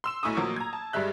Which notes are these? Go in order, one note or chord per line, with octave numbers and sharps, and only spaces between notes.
C6 E6 E7
B1 A3 E4 G#5 C#6 D#6
A#2 F3 F#3 A#3
A#5 G#6
A5
G2 G3 G#3 E5 F#6